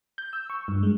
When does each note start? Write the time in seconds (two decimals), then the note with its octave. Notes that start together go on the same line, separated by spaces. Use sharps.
0.18 G6
0.33 E6
0.50 C#6
0.68 G2
0.83 G#3